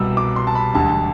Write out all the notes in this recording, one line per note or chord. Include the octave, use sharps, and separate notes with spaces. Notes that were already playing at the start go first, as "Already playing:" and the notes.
Already playing: C2 B2 G3 E6
D6
C6
A5
B5
E1 D2 D3 G3 A5